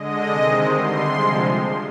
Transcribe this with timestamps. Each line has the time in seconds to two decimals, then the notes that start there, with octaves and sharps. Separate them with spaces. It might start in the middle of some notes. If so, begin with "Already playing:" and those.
Already playing: D3 G#3 D#5
0.28 C3 D#3 G#3
0.67 D3 G3 C6
1.06 C3 F3 G#3